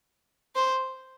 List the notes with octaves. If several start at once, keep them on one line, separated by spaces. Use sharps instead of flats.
C5